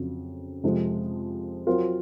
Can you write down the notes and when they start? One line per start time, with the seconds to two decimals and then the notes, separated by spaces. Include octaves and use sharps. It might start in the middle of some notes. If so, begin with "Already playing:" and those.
Already playing: F2 C#3 F#3
0.64 F2 C3 F3 G#3
1.67 F#3 C4 F4 A#4